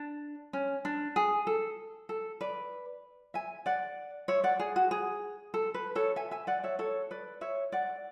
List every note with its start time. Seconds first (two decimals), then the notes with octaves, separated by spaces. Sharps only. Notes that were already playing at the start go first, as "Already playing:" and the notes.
Already playing: D4
0.53 C#4
0.85 D4
1.16 G#4
1.47 A4
2.09 A4
2.41 B4 D5
3.34 E5 G#5
3.66 D5 F#5
4.28 C#5 E5
4.44 D5 F#5
4.60 G#4
4.76 F#4
4.91 G#4
5.54 A4
5.74 B4
5.95 A4 C#5
6.16 E5 G#5
6.31 E5 G#5
6.47 D5 F#5
6.63 C#5 E5
6.79 A4 C#5
7.11 B4 D5
7.41 C#5 E5
7.72 D5 F#5